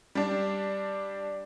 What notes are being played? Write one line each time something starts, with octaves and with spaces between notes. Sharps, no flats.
G3 D4